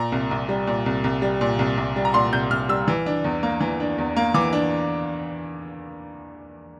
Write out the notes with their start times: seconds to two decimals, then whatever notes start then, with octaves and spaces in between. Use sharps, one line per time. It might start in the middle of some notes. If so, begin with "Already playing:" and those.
Already playing: A#2 A#5
0.12 C2
0.31 C2
0.49 G3
0.67 A#2
0.86 C2
1.04 C2
1.22 G3
1.41 A#2
1.59 C2
1.77 C2
1.96 G3
2.05 A#5
2.14 A#2 C6
2.33 C2 G6
2.51 C2 F6
2.69 G3 E6
2.88 E3
3.06 D4
3.24 E2
3.43 A#3
3.61 E3
3.80 D4
3.98 E2
4.16 A#3
4.34 E3 D6
4.53 D4